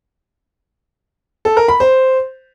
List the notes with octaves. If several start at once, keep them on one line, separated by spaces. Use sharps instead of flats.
A4
A#4
B5
C5